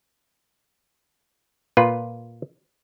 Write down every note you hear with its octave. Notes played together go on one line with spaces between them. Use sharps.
A#2 F4 B4